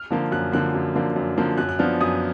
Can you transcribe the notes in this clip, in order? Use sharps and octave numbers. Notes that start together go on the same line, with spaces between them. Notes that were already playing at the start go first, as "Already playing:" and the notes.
Already playing: F6
D3 F3 A#3
F#2 F#6
D3 F3 A#3 F#6
F#2
D3 F3 A#3
F#2
D3 F3 A#3
F#2 F#6
F#6
F3 B3 D4 F6
F#2 D#6